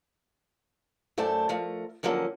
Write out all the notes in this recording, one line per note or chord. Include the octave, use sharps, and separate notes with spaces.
F#2 A3 C5 D5 A5
F3 A3 A#4
D3 F3 F#3 A#3 C#4